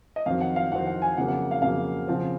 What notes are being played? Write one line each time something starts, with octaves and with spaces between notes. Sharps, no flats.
D#5
F2 D#3 F#3 C4 F5
F#5
F5
F2 D#3 F#3 C4 F#5
F#5
G#5
F2 C#3 F#3 A#3 F#5
F#5
F5
F2 C#3 F#3 A#3 F5
C#3 F3 C4